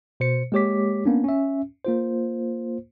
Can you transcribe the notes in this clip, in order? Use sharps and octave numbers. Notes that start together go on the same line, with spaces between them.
B2 C5 C#7
G#3 A#3 G4 C#5 D6 B6
A#3 B3 C#4 D4
C#4 E5
A#3 F4 C5